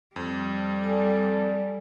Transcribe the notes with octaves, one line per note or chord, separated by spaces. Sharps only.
F2 G3
A4 D5 G#5 A5